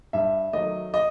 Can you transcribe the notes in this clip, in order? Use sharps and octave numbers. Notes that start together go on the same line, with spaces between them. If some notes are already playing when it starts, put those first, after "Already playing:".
G2 E5
D#3 F#3 A3 D#5
D#5